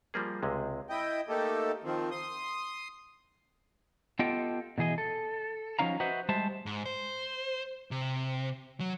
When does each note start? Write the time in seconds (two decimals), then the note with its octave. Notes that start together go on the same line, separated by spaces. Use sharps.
0.14 F3 G3 A#3 G#4
0.43 C#2 C3 G#3
0.89 E4 D#5 G5
1.29 A3 A#3 D#4 G4 A4
1.84 D#3 F3 C4
2.11 C6 D#6
4.19 B3 F4 G4 A4 D#5 G5
4.78 B2 E3 G#4 D#5
4.98 A4
5.79 F3 F#3 C#4 D#4 F5 A#5
6.00 F#4 B4 C5 D#5 E5 F#5
6.29 G3 G#3 C5 E5 A5
6.66 G#2
6.86 C5
7.91 C3
8.80 F#3